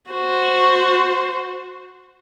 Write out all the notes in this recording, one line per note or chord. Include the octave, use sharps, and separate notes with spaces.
F#4 C5